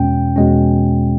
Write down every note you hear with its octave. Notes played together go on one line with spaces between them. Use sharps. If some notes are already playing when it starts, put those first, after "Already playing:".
Already playing: E2 B2 G#3 C#4 G5
E2 B2 G#3 C#4